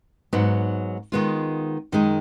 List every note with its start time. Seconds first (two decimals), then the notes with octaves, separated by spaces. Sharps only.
0.33 G#2 F#3 B3 D#4
1.12 D#3 G#3 B3 F4
1.92 F#2 D#3 G#3 D#4